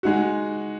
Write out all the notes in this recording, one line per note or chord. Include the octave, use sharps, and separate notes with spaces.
G#3 D#4 F#4